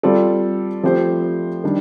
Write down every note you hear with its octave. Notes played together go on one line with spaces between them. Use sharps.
G3 C4 F4 A4 D5
F3 A3 C4 G4 C5
D#3 G3 D4